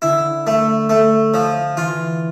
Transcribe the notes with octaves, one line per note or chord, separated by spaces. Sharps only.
D3 E4
A3
A3
F3
E3 F4